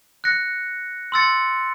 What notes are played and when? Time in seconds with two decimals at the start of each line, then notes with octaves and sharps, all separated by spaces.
0.24 F#6 A#6 C#7
1.12 C6 E6 A6 C#7